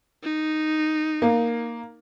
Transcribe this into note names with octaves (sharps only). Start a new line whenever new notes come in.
D#4
A#3